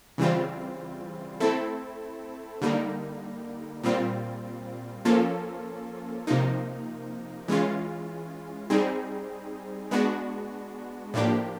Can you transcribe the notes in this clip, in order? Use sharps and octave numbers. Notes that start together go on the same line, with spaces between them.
C#3 E3 G3 C4 F4
A3 C4 E4 A4
D3 G3 A#3 D#4
A#2 G3 C4 F4
F3 A#3 C#4 F4 A4
C3 F3 A#3 D#4
E3 G#3 C#4 F4
G3 C4 D#4 G#4
G#3 B3 D4 F#4
A2 F3 A#3 D4 G4